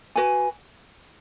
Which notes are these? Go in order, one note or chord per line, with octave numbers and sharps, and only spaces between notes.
F#4 B4 G#5